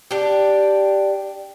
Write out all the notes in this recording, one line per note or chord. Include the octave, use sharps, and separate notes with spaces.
D4 G4